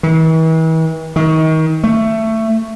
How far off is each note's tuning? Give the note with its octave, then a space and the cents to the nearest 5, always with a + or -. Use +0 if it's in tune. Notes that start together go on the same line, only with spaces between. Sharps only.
E3 -40
D#3 +30
A3 +15